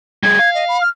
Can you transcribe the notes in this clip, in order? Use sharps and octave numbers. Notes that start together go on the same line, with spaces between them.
G3 G#4 G#6
F5
D#5
B5
F6